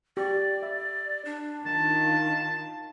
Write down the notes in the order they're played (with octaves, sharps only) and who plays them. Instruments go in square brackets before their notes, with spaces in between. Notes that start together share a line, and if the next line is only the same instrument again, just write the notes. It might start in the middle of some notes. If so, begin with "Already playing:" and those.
[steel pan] G4 C#6 [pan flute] D5
[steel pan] E5
[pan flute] D4
[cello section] D#3 F4 [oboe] A5